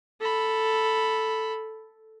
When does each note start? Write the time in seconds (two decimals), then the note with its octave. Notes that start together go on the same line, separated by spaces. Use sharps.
0.21 A4 B5